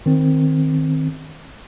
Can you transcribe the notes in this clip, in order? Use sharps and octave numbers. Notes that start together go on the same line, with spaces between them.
D#3 C4